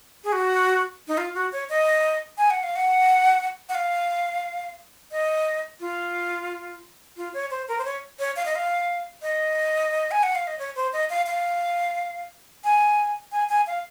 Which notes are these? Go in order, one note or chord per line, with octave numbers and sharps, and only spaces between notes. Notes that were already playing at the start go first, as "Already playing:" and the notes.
G#4
F#4
D#4
F4
F#4
C#5
D#5
G#5
F#5
F5
F#5
F#5
F5
D#5
F4
F4
C#5
C5
A#4
C5
C#5
C#5
F5
D#5
F5
D#5
G#5
F#5
F5
D#5
C#5
C5
D#5
F5
F5
G#5
G#5
G#5
F5